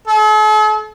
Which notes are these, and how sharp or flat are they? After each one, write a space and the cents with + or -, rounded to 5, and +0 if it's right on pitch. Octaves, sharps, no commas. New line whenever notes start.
A4 -45